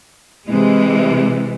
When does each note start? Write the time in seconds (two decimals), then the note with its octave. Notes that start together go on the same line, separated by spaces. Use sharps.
0.48 C3 E3 G#3